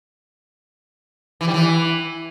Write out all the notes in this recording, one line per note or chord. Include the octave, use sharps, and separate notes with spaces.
E3
G3
E3